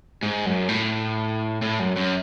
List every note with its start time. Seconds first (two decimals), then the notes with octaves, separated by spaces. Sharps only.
0.23 G#2
0.46 F#2
0.69 A2
1.62 A2
1.80 F#2
1.96 F#2